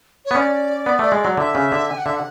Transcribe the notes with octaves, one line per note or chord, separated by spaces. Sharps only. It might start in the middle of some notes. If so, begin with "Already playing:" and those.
C#5
B3
C#4 D5
B3
A3
G#3
F#3
D3 E5
C#3
D3
G#5
F#5
D3 E5
F#5